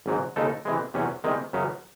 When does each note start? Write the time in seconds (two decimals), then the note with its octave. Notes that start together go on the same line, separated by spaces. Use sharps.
0.06 G#1 G#2 F#3
0.36 D#2 C#3 G#3 D#4 A4
0.65 C3 E3 G#3
0.94 E2 C3 F#3 C#4
1.24 C2 C3 D#3 G#3
1.53 F#2 C#3 F#3 C#4